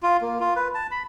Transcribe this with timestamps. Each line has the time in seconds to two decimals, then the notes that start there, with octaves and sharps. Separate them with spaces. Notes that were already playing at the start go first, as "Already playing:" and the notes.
0.03 F4
0.21 A#3
0.40 F4
0.56 B4
0.75 A5
0.91 B5